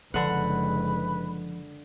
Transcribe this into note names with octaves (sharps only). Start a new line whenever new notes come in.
F#1 D3 F3 G#3 B4 F#5